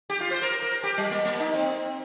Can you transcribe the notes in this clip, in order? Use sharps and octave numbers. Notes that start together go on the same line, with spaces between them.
G4
F4
C5
A#4
A#4
G4
G3
A#3
A#3
D#4
C4